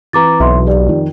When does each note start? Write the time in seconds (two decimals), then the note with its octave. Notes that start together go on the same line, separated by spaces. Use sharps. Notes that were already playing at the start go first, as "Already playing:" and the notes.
0.13 E3 C4 B4 A#5 D6 A6
0.40 B1 E5 C6
0.67 G4 D5
0.87 F2 D#3